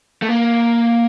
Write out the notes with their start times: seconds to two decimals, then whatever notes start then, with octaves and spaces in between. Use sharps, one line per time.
0.22 A3
0.28 A#3